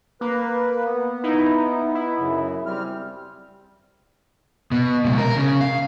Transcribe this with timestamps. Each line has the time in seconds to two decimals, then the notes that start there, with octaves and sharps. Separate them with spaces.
0.21 A#3 B4
0.84 B3
1.23 D#4 E4
1.95 E4
2.19 F#2 C#3
2.66 G3 C4 F6
4.72 B2
5.04 C#2 B2
5.18 A#4
5.36 C#3
5.61 F5